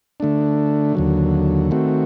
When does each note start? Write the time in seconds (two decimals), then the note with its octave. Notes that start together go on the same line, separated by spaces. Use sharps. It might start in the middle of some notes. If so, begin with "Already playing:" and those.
0.20 D3 A3 D4
0.95 D#2 D3 F#3
1.71 D#3 A3 C4 F#4